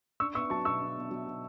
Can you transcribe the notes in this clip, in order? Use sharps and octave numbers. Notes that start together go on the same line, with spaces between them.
D4 C#6 E6
B3 C#6 E6
F#3 A5 C#6
B2 C#6 E6
D4
B3
F#3
B2